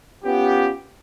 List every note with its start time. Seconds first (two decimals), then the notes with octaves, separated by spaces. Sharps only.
0.25 B3 C#4 F4 G4